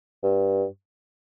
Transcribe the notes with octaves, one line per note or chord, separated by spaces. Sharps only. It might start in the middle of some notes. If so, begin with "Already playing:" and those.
G2